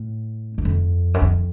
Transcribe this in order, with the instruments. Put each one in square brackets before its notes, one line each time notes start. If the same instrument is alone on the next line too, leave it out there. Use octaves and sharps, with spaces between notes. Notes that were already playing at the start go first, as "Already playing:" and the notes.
Already playing: [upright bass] A2
F#2
F2
F#2
F2